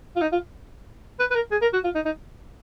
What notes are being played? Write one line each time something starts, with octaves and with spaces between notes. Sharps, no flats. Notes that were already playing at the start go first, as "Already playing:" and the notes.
F4
D#4
F4
B4
B4
A#4
G#4
A#4
F#4
F4
D#4
D#4